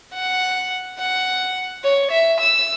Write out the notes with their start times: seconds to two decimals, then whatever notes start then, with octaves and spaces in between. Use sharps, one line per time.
0.14 F#5
0.99 F#5
1.84 C#5
2.11 E5
2.40 E6